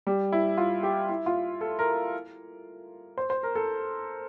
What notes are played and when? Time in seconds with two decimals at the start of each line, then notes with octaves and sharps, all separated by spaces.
0.07 G3
0.32 E4
0.58 F4
0.83 G4
1.09 E4
1.26 F4
1.61 A4
1.79 A#4
3.18 C5
3.30 C5
3.43 A#4
3.55 A4